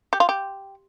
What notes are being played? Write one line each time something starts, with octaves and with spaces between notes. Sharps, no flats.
G4
F4
G4